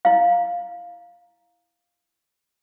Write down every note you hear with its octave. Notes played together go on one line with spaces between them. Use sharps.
E4 F5